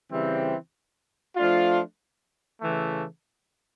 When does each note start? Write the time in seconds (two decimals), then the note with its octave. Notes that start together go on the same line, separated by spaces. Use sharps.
0.11 C#3 E3 G3 C4
1.36 F3 A3 D4 F4
2.62 C#3 E3 A3